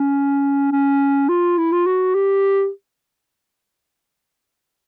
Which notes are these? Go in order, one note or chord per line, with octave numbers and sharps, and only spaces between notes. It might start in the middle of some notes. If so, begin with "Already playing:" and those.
Already playing: C#4
C#4
F4
E4
F4
F#4
G4